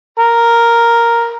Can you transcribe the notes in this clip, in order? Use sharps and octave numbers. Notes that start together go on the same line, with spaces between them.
A#4